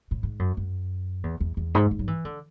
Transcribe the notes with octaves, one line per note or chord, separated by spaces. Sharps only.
A2
G#2
F#2
F#2
E2
E2
E2
G#2
G#2
F#3
E3
D3